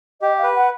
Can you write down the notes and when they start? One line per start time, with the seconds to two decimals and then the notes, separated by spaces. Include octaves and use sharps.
0.21 G4 D#5
0.38 F5
0.43 B4
0.55 F#5